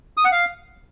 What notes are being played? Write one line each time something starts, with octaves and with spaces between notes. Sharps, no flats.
D#6
F#5
F5